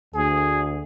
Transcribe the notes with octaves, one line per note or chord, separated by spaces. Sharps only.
D2 G#4